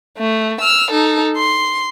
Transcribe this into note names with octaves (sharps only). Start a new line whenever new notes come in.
A3
E6 F6
D#4 A4
C6